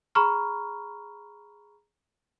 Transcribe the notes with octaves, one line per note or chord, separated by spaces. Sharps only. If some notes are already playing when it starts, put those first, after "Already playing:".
G#4 A#5 B5 C#6 F6